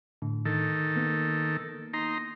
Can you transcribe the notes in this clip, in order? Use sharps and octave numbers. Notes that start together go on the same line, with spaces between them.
A2 D3
D#3 A4
A#3 B3
D#4 A#5 C6